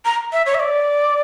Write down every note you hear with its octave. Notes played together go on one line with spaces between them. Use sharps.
A#5
E5
C#5
E5
D5